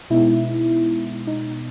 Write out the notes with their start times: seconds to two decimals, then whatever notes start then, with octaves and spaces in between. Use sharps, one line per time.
0.10 B2 G#3 B3 D#4 E4
1.27 D#4